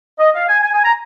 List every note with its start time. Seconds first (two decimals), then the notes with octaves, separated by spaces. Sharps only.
0.19 D#5
0.34 F5
0.48 G#5
0.63 G#5
0.73 G#5
0.84 A#5